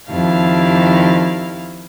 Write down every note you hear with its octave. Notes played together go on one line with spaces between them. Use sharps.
F2 D#3 E4 G4 F5 A5